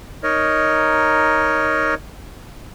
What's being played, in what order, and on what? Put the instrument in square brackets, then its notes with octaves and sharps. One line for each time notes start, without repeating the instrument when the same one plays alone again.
[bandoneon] D#4 A#4 C#5 D#5